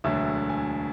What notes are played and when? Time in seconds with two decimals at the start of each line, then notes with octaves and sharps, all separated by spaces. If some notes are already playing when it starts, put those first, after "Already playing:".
0.04 E1 D2 D3 F#3 A3 E5
0.49 G#5